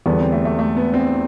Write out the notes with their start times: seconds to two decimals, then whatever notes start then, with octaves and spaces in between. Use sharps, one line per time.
0.06 E2 D3 G3 B3 D4
0.20 C4
0.32 A3
0.45 A3
0.59 A3
0.76 B3
0.94 C4